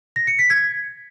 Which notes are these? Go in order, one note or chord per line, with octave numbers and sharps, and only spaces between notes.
A#6
C#7
B6
G#6